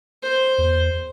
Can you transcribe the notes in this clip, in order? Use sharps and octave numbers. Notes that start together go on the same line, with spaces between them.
C5
E2